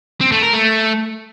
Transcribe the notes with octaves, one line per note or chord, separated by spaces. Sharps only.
C4
A3
A#4
A3